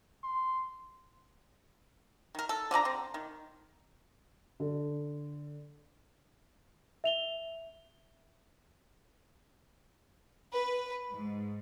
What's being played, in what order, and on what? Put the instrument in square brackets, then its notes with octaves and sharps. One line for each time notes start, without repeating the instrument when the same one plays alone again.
[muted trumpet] C6
[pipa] D#3 A#4
A4
D3 F3 D5 A#5
C4
D#3
[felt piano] D3
[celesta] E5 F7 G7
[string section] B4
G#2